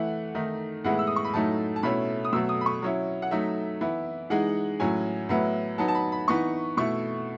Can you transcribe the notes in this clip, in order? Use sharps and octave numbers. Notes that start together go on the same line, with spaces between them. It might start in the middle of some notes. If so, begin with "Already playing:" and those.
Already playing: E3 A3 E4 F#5
D#3 A3 D#4
A2 E3 G#3 B3 E4 F#5
E6
D#6
C#6
B5
A2 F#3 A3 D#4 A5
A5
B2 A3 C#4 E4 B5
D#6
B2 F#3 A3 E6
D#6
B5
C#6
F#3 C#4 E4
F#5
F#3 A3 D#4 E5
E3 B3 E4
E3 G#3 D#4 F#5
A2 F#3 C#4 G#5
A2 F#3 B3 E4
F#3 B3 D#4 A5
A5
B5
B5
E3 B3 D#4 C#6
B2 A3 E4 C#6